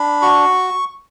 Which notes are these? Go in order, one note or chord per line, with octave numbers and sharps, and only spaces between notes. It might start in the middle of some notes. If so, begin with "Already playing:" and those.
Already playing: D4 B5
F#4 C#6